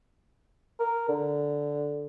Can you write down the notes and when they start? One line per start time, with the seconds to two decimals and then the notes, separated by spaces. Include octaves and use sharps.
0.80 A#4
1.09 D3